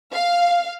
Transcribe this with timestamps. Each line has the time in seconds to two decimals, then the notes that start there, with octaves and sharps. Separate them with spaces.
0.13 F5